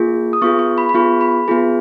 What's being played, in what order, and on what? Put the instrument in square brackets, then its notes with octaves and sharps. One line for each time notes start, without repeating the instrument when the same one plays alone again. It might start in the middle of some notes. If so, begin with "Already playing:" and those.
Already playing: [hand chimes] A#3 F4 G#4
D#6
B3 F4 G#4 C#6
C#6
B5
B5
B3 F4 G#4 C#6
B5
B3 F4 G#4